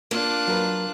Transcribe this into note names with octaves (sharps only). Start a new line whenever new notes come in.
A#3 D4 F4 F#6
F#3 A#4 B4